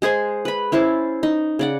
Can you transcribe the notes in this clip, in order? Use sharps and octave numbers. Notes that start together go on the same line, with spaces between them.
G#3 G#4 C5 G#5
B4 B5
C#4 E4 C5 A5
D#4
C#3 D5 F#5